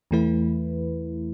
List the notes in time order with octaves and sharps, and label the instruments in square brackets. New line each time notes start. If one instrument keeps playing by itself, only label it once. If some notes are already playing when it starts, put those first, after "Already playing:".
[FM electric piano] E2 E3 A3 E4 B4